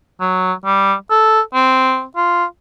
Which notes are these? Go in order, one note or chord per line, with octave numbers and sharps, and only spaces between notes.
F#3
G3
A4
C4
F4